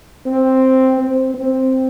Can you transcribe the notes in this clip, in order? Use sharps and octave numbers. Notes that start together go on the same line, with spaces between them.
C4
C4
C4